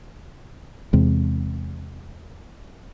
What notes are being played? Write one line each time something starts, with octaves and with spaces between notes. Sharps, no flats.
E2 C3 G#3